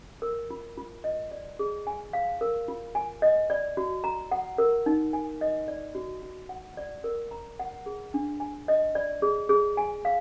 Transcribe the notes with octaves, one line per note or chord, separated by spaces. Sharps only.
A#4
F4
F4
D#5
D5
G#4
G#5
F5
A#4
F4
G#5
D#5
D5
F#4
A#5
F#5
A#4
D#4
G#5
D#5
D5
F#4
F#4
F#5
D5
A#4
A#5
F#5
G#4
D4
G#5
D#5
D5
G#4
G#4
G#5
F5